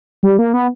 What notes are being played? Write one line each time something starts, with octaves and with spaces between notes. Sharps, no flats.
G3
A#3
B3